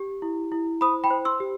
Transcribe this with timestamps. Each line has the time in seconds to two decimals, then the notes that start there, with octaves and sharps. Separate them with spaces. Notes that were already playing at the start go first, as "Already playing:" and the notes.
Already playing: G4
0.22 E4
0.52 E4
0.81 C5 B5 D#6
1.04 G5 B5
1.10 C5
1.25 C6 E6
1.40 G4